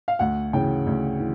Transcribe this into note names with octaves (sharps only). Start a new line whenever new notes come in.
F5
D2 F#5
C#3 E3 G5
D2
E3